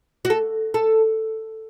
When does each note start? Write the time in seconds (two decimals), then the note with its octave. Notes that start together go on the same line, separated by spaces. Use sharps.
0.25 F#4
0.30 A4
0.74 A4